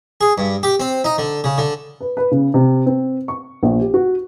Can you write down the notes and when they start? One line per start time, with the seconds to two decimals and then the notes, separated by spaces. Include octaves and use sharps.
0.21 G#4
0.38 G2
0.63 G4
0.80 C4
1.04 D#4
1.18 D3
1.44 C#3
1.58 D3
2.01 B4
2.17 B4
2.31 C#3
2.54 C3
2.86 C4
3.28 C#6
3.63 A#1
3.80 G4
3.94 F#4